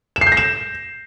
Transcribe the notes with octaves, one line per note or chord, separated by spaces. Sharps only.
E7
C7
G6
A#6
E7